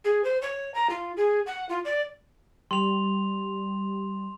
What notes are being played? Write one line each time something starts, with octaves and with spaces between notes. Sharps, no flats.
G#4
C5
C#5
A#5
F4
G#4
F#5
F4
D5
G3 C6 F7